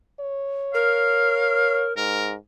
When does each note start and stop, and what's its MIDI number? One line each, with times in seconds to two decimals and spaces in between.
0.20 1.91 73
0.74 1.92 70
0.74 1.82 77
1.97 2.36 44
1.97 2.32 70